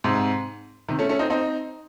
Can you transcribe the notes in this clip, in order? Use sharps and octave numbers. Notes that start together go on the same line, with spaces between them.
G#2 C3
C3 D#3
A3 C#4
A3 C#4
C4 D#4
C4 D#4